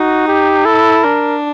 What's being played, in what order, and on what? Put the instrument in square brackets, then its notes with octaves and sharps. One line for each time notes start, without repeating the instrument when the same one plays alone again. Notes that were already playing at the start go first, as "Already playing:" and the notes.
Already playing: [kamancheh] D#4 [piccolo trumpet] F#4
[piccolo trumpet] G4
[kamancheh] E4 [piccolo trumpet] A4
[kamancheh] D4 [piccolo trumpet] A#4